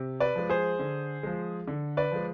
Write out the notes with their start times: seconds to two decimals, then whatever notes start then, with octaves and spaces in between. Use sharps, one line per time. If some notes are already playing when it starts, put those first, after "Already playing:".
Already playing: C3
0.20 B4 D5
0.35 F3 G#3
0.50 G#4 C5
0.79 D3
1.23 F3 G#3
1.68 D3
1.97 B4 D5
2.12 F3 G#3